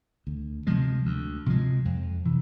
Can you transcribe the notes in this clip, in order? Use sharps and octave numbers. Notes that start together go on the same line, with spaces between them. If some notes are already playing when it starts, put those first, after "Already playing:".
D2
C3 F3 G#3
D2
C3 F3 G#3
F2
C3 E3